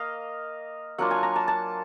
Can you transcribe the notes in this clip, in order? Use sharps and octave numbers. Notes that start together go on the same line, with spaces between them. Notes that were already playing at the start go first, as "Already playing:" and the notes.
Already playing: A#3 D#5 F5
F#3 A#3 D4 F4 F#5
G#5
A#5
A5
A5